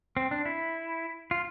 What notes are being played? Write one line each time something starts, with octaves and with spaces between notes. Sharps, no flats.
C4
D4
E4
F4